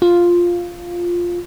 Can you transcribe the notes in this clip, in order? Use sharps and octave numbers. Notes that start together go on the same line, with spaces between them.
F4